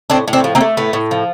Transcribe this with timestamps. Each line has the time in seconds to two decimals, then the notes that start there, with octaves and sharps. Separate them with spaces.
0.10 A2 C4 D4
0.28 A2
0.33 C4 D4
0.44 F3
0.55 A#3 C4
0.61 A3
0.77 A2 B3
0.93 A2
1.11 F3